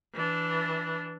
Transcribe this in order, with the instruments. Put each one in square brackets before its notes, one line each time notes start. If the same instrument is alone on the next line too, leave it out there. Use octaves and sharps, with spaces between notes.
[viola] E3 D4